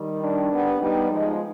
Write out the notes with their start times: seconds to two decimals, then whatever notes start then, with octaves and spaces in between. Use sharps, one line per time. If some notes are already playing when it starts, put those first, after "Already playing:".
Already playing: D#3 G3
0.22 D4
0.51 G3 B3
0.80 G3 B3 D#4
1.10 F3 G#3